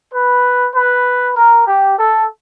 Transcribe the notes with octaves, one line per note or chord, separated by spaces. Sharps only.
B4
B4
A#4
G4
A4